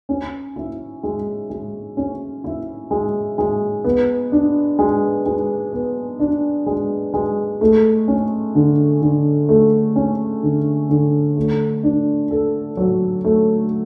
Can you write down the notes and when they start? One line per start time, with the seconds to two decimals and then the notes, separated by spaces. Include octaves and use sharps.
0.09 C#4
0.56 E4
1.03 G#3
1.50 G#3
1.97 C#4
2.44 E4
2.91 G#3
3.38 G#3
3.84 B3
4.32 D4
4.79 G#3
5.26 G#3
5.73 B3
6.20 D4
6.66 G#3
7.14 G#3
7.61 A3
8.08 C#4
8.55 D3
9.02 D3
9.49 A3
9.96 C#4
10.43 D3
10.89 D3
11.37 A3
11.83 D4
12.31 A4
12.77 F#3
13.24 A3